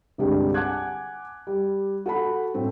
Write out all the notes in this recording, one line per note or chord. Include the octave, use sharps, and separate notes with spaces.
C2 G2 D3 G3 G#3
F#5 G#5 A5 D6 F#6 G#6
G3
F#4 A4 F#5 A5 B5
A2 A3 C4